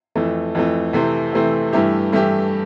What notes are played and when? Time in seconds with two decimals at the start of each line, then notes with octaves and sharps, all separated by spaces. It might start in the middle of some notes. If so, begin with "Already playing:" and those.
0.15 F2 E3 A3
0.55 F2 E3 A3
0.93 C3 E3 A3 C4
1.33 C3 E3 A3 C4
1.73 G2 E3 A3 E4 G4
2.12 G2 E3 A3 E4 G4